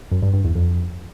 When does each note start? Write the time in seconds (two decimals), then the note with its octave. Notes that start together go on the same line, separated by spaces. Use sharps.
0.11 F#2
0.22 G2
0.33 G2
0.44 E2
0.55 F2